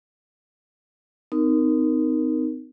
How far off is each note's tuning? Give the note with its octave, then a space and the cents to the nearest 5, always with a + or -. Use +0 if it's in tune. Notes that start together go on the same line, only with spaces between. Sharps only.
C4 -40 D#4 -5 A#4 +0